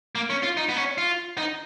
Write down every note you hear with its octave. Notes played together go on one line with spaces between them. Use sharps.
A#3
C#4
F4
D#4
B3
C#4
F4
D#4